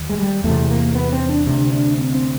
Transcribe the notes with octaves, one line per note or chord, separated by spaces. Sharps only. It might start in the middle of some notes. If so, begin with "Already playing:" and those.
Already playing: D#2
G#3
G3
E2 A3
C3
A#3
B3
C4
D4
D2 C3 D4
D4
C4
C4